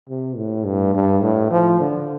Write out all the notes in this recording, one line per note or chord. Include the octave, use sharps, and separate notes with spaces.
C3
A2
G2
G2
A2
F3
D3